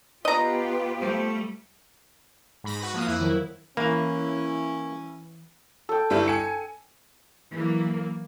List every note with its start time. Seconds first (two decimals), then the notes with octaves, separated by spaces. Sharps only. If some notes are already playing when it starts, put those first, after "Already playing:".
0.25 B3 F4 G4 B4 D#5 A#5
1.00 G3 A3 C5
2.64 G#2 B5 A#6
2.81 F#4 B4
2.94 F3 A#3 D#6
3.07 F2 A#3 E4 F#6
3.19 D#3 F#3
3.77 E3 A#3 C#4 E4
5.89 A4 G5
6.10 G1 G3 E4
6.28 G#5 C#7
7.52 E3 F#3 A#3